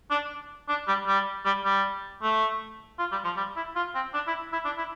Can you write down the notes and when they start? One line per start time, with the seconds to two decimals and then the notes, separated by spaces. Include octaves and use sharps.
0.11 D4
0.69 D4
0.88 G3
1.07 G3
1.45 G3
1.65 G3
2.22 A3
2.99 F4
3.12 G3
3.25 F3
3.37 G3
3.56 E4
3.76 F4
3.95 C4
4.14 D4
4.27 E4
4.53 E4
4.65 D4
4.78 E4